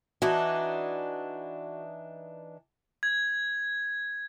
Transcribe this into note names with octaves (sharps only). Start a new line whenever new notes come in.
E3 D4 D#4 F#4
G#6